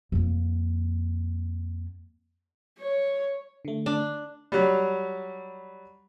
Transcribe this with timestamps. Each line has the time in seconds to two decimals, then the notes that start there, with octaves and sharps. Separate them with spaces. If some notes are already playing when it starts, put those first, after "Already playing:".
0.12 F2 A#3
2.79 C#5
3.65 D3 A3
3.86 D4
4.52 F#3 G3